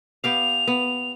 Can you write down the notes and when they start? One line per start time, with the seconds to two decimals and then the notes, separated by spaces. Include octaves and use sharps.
0.24 B3 G4 F5 F7
0.68 B3